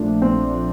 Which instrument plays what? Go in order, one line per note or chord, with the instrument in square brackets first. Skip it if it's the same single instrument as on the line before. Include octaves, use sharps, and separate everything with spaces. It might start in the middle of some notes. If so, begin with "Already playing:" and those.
Already playing: [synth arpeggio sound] A#1 A#2 F3 A3 D4
[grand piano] C4